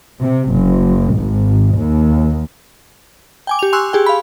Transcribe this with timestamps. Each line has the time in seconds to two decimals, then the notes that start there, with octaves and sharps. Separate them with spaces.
0.20 C3
0.54 F#1
1.17 G#1
1.78 D#2
3.47 G5 G#5 D6
3.59 G4 F7
3.73 G#5 C6 C#6 E6 F#6
3.93 G4 G#4 G5
4.06 F5 B5